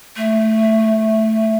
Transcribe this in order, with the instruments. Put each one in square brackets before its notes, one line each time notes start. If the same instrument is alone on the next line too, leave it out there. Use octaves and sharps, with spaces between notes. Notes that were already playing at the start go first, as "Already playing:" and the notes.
[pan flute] A3